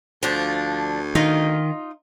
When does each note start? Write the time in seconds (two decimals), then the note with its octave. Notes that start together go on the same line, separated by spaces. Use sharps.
0.23 D2 F3 D4
1.15 D#3 D#4 F4 D#5